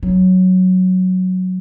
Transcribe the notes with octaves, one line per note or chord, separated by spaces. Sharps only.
F#3